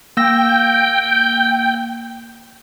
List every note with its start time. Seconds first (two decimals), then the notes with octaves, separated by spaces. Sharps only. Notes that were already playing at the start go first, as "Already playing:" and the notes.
0.17 A#3 G5 E6 A#6